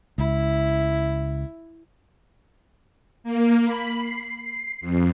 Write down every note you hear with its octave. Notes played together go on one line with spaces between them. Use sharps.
C#2 E4
A#3
B5
C7
C7
F2